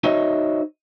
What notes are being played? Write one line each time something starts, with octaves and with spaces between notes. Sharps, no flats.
D#4 F#4 C5 C#5 D#5 E5